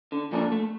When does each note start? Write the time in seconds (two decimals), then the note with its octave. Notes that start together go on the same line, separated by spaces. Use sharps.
0.12 D3
0.32 F3 A#3 D4 A4
0.52 A3